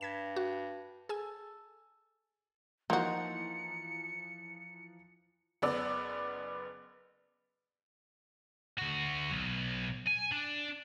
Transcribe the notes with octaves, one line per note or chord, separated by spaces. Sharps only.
G2 G#6 B6 E7
F#4
G#4 A4 G#5 E6
E3 F3 A#3 D#4 F#4 C5 A#5 C#7
F#1 B3 D5 E6
D2 F#4
B1
G#5
D4